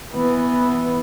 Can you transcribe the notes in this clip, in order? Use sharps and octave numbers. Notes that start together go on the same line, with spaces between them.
E3 B3